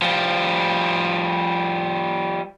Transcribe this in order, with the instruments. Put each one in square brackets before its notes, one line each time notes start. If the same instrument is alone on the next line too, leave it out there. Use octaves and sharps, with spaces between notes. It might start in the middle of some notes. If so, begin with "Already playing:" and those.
[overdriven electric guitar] F3 G3